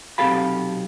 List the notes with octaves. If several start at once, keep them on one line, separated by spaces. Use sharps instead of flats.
B1 C3 G4 A4 F5 B5